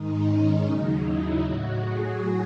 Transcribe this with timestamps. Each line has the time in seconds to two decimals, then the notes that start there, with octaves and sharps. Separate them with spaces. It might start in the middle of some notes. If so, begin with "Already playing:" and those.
Already playing: G#2 D#3 G#3 D#4
0.27 C#4
0.65 D#2 C#3 F#3 D#4
1.03 E4
1.41 A2 F#3 F#4
1.79 G#4